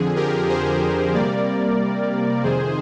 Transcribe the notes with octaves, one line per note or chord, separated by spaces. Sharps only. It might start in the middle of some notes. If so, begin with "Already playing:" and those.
Already playing: F2 D3 F3 G#4
G4 A#4
G#4 C5
C3 G3 A#3 A#4 D5
F2 C3 D#3 G#4 C5